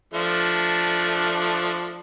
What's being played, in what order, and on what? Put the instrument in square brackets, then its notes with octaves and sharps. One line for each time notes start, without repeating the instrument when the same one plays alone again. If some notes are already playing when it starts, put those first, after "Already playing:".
[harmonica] F3 A3 D4